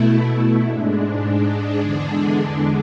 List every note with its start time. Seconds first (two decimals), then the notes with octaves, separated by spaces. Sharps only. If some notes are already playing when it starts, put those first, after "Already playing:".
Already playing: B2 A3 E4
0.65 G#2 G#3 D4
1.81 E2 D3 G#3 D4